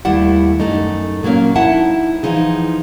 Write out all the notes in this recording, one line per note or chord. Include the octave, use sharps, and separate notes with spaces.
D#2 G3 A3 E4 F#5
F#2 A3 D#4
A#2 F#3 A3 A#3 C#4
D#4 E4 E5 F#5 A5
E3 F3 D#4 G#4